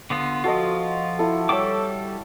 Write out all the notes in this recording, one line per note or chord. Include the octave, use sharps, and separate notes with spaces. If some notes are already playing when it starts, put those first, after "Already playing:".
D3 B3 F4
F3 F4 F#4 A4 D#5
E4 A4
G3 A4 C#5 G5 D6